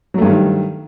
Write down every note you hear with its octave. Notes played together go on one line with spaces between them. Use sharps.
G2 D#3 F#3 G3 A3